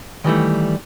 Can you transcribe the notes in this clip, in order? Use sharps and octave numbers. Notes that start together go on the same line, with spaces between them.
D#3 E3 G3 A3